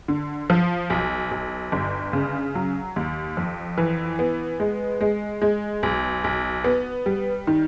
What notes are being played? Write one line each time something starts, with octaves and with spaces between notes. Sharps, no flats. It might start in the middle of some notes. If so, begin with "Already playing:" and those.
D3
F3
B1
B1
G1
C#3
F#3
D#2
F2
E3
B3
G#3
G#3
G#3
B1
B1
B3
G3
D#3